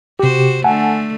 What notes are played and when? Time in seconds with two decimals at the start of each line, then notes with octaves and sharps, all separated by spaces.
0.19 C3 F#4 G4 C5
0.64 D3 A3 F#5 G#5 A5